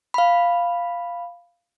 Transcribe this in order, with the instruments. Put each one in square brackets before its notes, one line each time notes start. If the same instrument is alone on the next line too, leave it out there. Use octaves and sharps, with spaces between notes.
[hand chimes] F5 B5